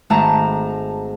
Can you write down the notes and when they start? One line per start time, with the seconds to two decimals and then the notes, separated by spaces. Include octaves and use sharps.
0.10 G#1 A3 A5 A#5 E7